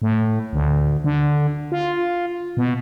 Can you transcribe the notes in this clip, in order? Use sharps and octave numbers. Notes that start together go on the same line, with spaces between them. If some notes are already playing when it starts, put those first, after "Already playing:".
A2
D2
D3
F4
B2